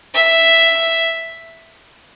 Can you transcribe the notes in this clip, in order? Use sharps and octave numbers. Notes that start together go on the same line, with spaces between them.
E5